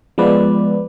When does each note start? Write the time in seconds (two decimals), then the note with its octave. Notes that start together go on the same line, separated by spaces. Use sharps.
0.18 F3 G#3 B3 B4 D5